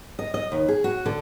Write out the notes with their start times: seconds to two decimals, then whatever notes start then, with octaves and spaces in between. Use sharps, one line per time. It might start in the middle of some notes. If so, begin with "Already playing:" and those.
0.19 D#5
0.34 D#5
0.52 D#2
0.68 G#4
0.84 F#4
1.06 D3